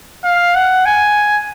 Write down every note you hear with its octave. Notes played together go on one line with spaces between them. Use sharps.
F5
F#5
G#5